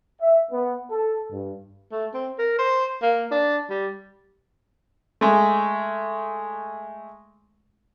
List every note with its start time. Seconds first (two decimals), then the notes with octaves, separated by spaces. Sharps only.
0.22 E5
0.52 B3
0.91 A4
1.32 G2
1.92 A3
2.14 C4
2.39 A#4
2.59 C5
3.02 A#3
3.31 D4
3.70 G3
5.21 G#3 A3